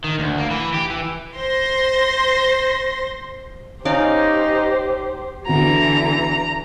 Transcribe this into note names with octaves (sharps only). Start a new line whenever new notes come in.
D#3
D2
A#3
E3
G4
E3
C5 C6 A#6
C#4 D#4 G4 C5 D5 F5
E2 D3 E3 F#4 A#5